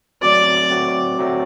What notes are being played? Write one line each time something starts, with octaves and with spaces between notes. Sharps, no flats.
F#3 A3 C4 F#4 D5
F#3 A3 C4 F#4
F#3 A3 C4 F#4